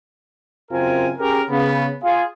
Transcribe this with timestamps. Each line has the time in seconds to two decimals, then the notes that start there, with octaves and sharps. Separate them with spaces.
0.71 F#2 C#3 C4 F4 A#4 G#5
1.19 C#4 G4 G#4 A#4
1.49 C#3 B3
2.02 F4 G#4